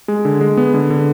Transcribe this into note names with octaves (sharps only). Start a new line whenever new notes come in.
G#3
D3
G#3
B3
D3
D3